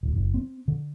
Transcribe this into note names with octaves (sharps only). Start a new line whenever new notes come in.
D1
F#1
C4
D3